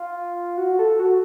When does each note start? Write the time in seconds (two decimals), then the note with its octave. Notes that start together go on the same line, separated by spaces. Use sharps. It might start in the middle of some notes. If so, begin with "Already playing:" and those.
Already playing: F4
0.58 F#4
0.79 A4
0.99 F#4